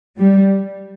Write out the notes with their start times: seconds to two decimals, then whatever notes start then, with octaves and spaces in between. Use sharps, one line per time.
0.17 G3